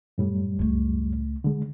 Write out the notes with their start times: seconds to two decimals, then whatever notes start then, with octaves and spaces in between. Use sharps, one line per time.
0.18 F#2 A2 G3
0.59 C#2 A3
1.44 D3 G#3